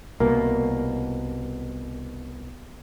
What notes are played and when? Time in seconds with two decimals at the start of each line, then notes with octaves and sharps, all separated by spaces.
0.20 C2 B2 A#3